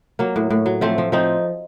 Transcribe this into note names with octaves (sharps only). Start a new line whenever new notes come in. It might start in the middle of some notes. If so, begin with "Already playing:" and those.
F#3 A#3
A2
A2
F#3
F3 A3 C4
F3
F3 C4 D#4